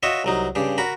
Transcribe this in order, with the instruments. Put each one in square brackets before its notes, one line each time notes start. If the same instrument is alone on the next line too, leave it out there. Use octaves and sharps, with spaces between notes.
[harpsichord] F4 F#4 C#5 D#5 E5
C2 F#3 D#4
G2 C#3 G4
F#4 A#4 B5